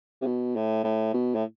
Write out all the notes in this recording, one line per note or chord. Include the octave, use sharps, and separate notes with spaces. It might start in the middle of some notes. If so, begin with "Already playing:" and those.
C3
B2
A2
A2
B2
A2